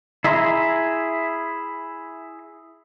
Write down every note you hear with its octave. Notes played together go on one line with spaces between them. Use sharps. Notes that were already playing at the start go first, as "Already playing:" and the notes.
E4 G#4 E5 A#5 C6